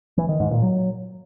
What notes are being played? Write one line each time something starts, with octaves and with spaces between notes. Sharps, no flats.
E3
D#3
G#2
A#2
F#3